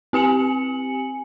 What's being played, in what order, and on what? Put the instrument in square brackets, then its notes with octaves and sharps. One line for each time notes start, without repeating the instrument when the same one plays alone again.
[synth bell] C4 G4 G#5 C#7 F#7